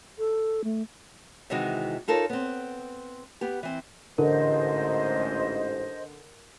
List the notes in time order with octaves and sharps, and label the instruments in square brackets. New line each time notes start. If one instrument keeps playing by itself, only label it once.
[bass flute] A4
A3
[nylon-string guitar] C3 D#3 E3 G#3 D#4 F#4
D#4 F4 A4 A#4 C#5
B3 C4
B3 G4
E3 C4
[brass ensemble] A1 G#2 [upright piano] D3 [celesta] A#4 [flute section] C5 D#5